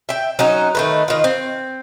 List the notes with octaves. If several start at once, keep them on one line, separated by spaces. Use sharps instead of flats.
E5 G5
F#3 C#4 D#4
D#3 A3 B4
D#3 F4
C4